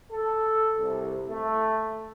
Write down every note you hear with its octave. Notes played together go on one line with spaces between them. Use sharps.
A4
C2
A3